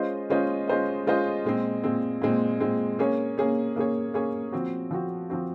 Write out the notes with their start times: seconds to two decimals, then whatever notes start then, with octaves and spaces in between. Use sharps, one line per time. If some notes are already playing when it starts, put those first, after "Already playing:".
Already playing: G#3 C#4 F4 C5 D#5
0.30 G#3 C#4 F4 C5 D#5
0.68 G#3 C#4 F4 C5 D#5
1.07 G#3 C#4 F4 C5 D#5
1.45 A#2 G#3 C4
1.83 A#2 G#3 C4
2.22 A#2 G#3 C4
2.60 A#2 G#3 C4
2.99 A#3 C#4 G#4 C#5
3.38 A#3 C#4 G#4 C#5
3.76 A#3 C#4 G#4 C#5
4.14 A#3 C#4 G#4 C#5
4.53 F3 C4 F#4
4.91 F3 C4 F#4
5.30 F3 C4 F#4